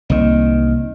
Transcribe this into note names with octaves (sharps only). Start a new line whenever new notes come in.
C2 D#3 A#3 D#5